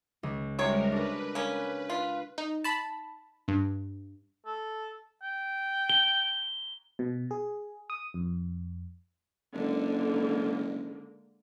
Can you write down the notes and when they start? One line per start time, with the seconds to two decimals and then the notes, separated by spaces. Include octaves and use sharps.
0.23 C#2
0.59 C3 G3 G#3 F#4 A#4 C#5 C#6
0.92 D4 A#4 B4
1.35 A#3 C#4
1.90 F4
2.38 D#4
2.64 A5 B5
3.48 G2
4.46 A4
5.23 G5
5.90 G7
6.99 B2
7.31 G#4
7.90 D#6
8.14 F2
9.54 F#1 D3 G#3 A#3